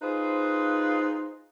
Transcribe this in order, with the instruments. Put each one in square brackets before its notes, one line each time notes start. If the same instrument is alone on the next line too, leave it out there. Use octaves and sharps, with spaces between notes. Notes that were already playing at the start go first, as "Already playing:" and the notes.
[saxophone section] D#4 F4 G#4 B4 C5